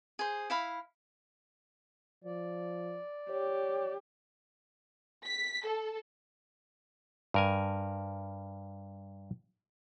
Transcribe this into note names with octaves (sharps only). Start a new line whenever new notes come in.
G#4 C5
E4 F5 B5
F3 D5
G4 C#5
B6
A4
G2 A#4 G#5